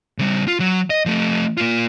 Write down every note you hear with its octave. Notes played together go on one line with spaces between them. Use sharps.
C#3 G3
F4
F#3
D#5
F3 A3
A#3 F4